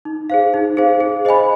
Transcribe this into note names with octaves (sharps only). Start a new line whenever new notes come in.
D#4
G#4 C5 F5
D#4
G#4 C5 F5
G#4
C5 D#5 G#5 B5